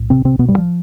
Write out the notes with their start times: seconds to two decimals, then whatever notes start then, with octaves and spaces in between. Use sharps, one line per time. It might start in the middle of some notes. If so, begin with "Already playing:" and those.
Already playing: B1 A2
0.10 C3 C4
0.25 C3 C4
0.39 B2 B3
0.48 G2 G3
0.58 F3